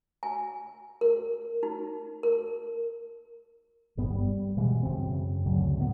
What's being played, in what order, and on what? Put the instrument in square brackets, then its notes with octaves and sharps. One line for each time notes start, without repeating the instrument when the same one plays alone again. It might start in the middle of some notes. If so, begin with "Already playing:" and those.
[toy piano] G#5
A#4
D#4
A#4
[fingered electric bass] G1 G2 B3
G3
B2 E3 G#3
F#2 C#3 C4
D2 C#3 F#3
A2 B3